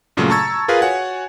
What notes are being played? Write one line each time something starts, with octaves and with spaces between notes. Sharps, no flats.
G2 A#2 C#3 F#3 A3
A5 A#5 C#6 E6 G#6 A6
F4 G#4 A#4 B4 F5
F#4 C#5 F#5 G#5